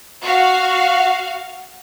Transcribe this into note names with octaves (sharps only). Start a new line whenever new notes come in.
F#4 F5